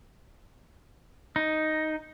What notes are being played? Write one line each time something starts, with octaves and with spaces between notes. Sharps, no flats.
D#4